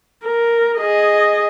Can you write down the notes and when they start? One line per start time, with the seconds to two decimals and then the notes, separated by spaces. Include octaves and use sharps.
0.24 A#4
0.78 G#4 D#5